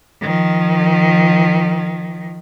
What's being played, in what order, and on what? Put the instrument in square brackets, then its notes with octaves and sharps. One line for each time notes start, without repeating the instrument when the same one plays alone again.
[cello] D#3 F3